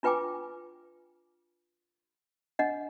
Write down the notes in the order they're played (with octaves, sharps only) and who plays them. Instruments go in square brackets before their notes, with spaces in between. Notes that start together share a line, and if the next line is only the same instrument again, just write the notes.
[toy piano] D4 F4 B4 G5 G#5 D6
D4 D#5 F#5